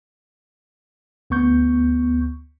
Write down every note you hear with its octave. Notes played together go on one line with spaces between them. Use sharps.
D2 B3 C#6 G6